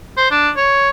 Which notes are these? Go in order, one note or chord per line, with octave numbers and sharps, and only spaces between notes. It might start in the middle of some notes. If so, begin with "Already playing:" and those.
C5
D4
C#5